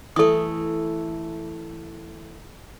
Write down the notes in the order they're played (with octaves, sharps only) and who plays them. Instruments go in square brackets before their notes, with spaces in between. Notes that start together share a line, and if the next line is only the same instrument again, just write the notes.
[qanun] E3 A3 [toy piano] A4 D#6